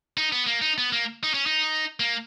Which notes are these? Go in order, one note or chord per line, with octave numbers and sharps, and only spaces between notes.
D#4
B3
A#3
D#4
B3
A#3
D#4
C#4
D#4
A#3